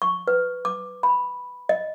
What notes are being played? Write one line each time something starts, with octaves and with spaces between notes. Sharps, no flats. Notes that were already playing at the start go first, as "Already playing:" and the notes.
C#6
B4
D6
B5
D#5